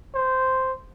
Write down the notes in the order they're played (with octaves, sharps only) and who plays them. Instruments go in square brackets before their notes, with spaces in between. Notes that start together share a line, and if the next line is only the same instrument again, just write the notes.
[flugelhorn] C5